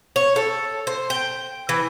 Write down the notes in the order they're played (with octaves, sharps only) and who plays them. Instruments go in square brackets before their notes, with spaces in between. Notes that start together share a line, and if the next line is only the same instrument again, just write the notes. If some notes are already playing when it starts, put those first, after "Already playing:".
[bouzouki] C#5
A4
C5
G5
E3